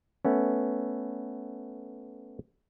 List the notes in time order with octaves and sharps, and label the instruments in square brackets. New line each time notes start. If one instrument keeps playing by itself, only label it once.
[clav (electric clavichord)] A3 B3 C#4